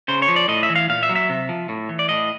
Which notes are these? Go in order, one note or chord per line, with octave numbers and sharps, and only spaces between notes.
C#3 C5
C#5
F3
D5
A2 D#5
E5
E3
F5
A#2 F5
E5
F#3
E5
C3
F3
A2
E3
D5
A2 D#5